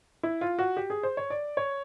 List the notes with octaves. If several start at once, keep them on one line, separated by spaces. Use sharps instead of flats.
E4
F4
F#4
G4
G#4
C5
C#5
D5
C#5